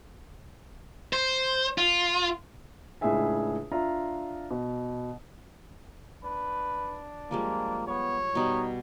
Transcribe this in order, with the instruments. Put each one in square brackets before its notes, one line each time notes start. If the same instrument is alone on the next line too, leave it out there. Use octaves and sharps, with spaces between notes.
[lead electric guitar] C5
F4
[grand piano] C#2 A2 D4 G#4 E5 G#5
D4 F4 E5 A#5
B2
[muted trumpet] D4 [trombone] B4
[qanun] F3 G3 G#3 [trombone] A#3
[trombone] B3 [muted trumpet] C#5
[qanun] B2 G3 B5 [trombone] D#4